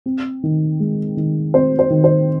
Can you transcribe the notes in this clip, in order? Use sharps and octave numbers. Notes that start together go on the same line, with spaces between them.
C4
D#3
G#3
D#3
C4 C5
C5
D#3
C5